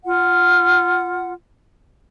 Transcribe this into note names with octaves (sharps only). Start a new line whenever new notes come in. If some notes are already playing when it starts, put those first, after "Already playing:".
F4 F#5